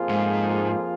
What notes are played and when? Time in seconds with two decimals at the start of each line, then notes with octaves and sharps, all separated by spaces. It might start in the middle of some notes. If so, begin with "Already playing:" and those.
Already playing: F2 F3 A#3 F4 G#4
0.09 G#2